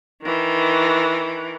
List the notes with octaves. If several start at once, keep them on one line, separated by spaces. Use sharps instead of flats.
D#3 E3